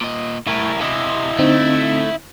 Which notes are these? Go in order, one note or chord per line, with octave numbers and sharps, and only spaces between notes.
A#2 D#5
A2 E4 A#4
C3 E4 D#5
D3 A3 C4 D#4